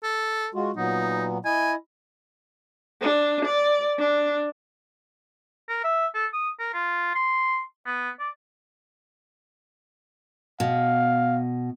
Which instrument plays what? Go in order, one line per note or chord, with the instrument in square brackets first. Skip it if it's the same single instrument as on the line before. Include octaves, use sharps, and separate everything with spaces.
[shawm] A4
[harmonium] G#3 F4 F#4
[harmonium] A#2 F#3 B3 [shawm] D#4
[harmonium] E4 D#5 [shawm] G#5
[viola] D4
D5
D4
[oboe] A#4
E5
A4
D#6
A#4
F4
C6
B3
D5
[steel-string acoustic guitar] B2 [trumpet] F5